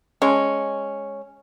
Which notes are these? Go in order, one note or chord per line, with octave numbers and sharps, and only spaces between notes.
G#3 C#4